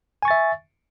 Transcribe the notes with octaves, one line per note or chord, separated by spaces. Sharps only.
E5 G#5 C#6 A6